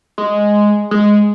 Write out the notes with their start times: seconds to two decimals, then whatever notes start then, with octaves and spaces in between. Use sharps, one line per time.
0.18 G#3
0.91 G#3